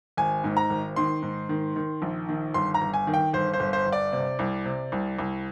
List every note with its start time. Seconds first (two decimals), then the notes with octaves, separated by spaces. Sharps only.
0.17 G#1 G#5
0.44 G#2
0.57 A#5
0.70 G#1
0.96 D#3 C6
1.22 G#2
1.49 D#3
1.76 D#3
2.02 A#1
2.29 D#3
2.54 G1 C6
2.74 A#5
2.81 G1
2.94 G#5
3.07 D#3
3.14 G5
3.33 G1 C5
3.53 C5
3.60 G1
3.73 C5
3.87 G1
3.92 D5
4.12 C3
4.39 C2
4.65 C3
4.92 C2
5.19 C2